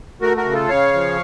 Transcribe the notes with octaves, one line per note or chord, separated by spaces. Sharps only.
A3 F#4 A#4
F#4 A#4
C#3
F4 A4
C#3 C#5 F5
F3